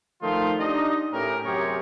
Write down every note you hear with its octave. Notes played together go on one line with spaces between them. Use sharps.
D#3 F3 A3 D#4 F4
D4 D#4 G4 D#5
A2 C#4 G4 A#4
F#2 C3 G4 G#4 C#5